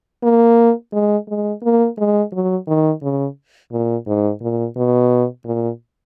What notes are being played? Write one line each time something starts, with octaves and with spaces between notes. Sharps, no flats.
A#3
G#3
G#3
A#3
G#3
F#3
D#3
C#3
A#2
G#2
A#2
B2
A#2